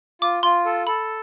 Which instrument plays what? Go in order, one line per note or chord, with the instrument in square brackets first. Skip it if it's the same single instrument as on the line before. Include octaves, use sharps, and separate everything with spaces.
[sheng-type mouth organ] F4 [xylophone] D6
[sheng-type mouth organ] F4 [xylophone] C6
[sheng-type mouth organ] A4
[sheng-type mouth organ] A4 [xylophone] B5